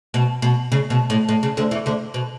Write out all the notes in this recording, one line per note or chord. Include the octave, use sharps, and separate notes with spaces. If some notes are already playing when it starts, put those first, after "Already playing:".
B2
B2
C#3
B2
A2
A2
C#3
D2 D3
E2 E3
D2 D3
B2